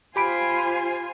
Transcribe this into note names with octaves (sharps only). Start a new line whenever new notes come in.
F4 G4 C5 G#5 B5 D7